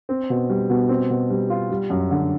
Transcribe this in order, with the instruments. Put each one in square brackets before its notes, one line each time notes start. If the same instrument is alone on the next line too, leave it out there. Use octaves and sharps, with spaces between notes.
[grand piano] C4
B2
G3
B2
C4
B2
G3
F4
G3
F#2
D3